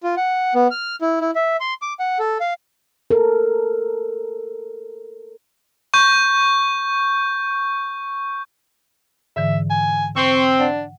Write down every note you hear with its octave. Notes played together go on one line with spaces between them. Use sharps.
F4
F#5
B3
F6
E4
E4
E5
C6
D6
F#5
A4
F5
A4 A#4
C#6 G6
G#2 D3 E3 E5
G#5
C4 C#6
D4 F#5